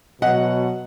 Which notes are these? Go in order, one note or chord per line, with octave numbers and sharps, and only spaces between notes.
B2 F#3 D#5 F#5